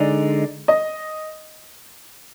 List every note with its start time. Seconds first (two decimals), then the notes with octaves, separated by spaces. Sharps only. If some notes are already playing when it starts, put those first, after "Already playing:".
Already playing: D3 G#3 D#4 D5
0.68 D#5